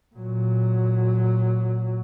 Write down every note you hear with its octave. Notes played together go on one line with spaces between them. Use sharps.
A#2 F#3